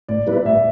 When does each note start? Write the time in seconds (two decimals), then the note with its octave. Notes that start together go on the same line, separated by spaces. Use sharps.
0.08 A2 D5
0.27 G3 B3 E4 B4
0.45 A2 E5